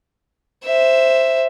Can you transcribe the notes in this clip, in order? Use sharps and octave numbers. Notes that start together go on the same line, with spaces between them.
C5 E5